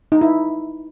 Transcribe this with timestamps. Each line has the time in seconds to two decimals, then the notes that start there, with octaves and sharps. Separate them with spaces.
0.12 D#4
0.21 E4